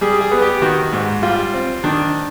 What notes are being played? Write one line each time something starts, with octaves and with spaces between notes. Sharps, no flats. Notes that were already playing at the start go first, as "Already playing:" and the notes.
G3 G#4
G#4
B3
G4
D#3 F#4
G#2
G3 F4
C4
D#3 D4